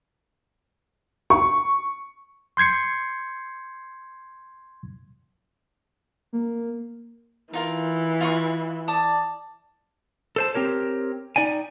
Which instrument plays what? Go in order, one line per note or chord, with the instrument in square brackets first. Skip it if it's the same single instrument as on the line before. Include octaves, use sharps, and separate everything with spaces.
[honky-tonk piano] C#6
[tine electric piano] C6 G6 G#6 C7 C#7
[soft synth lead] A#3
[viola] E3 [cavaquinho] D#4 F4 A#4
[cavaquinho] F4 D#5 C#6
D5 A5 D#6
[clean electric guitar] A4 C5 A5
C4 G4 A#4 C#5
D#4 D5 G5 G#5